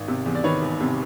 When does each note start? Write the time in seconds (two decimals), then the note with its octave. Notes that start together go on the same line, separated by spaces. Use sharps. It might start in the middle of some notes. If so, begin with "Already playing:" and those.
Already playing: G#1
0.08 C3
0.26 E2
0.35 D5
0.44 D#3 B4 C#5
0.62 E1
0.80 C3